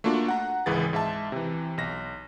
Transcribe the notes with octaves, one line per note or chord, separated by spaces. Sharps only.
A3 A#3 D4 F4 F#4
F#5 A#5
G#1 C#2 E3 G#4 B4 A6
G#2 E5 A5
C3 E3
B1 A#6